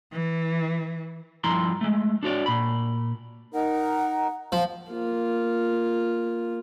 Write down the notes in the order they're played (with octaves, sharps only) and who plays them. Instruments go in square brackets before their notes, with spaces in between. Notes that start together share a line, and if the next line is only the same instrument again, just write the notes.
[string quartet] E3
[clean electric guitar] G2 F3 E4 A#5 C6
G#3 A3
D4 F#4 C#5 D5
A#2 B5
[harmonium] D#4 A#4 [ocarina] F#5
[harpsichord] F3
[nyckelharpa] A#3 F4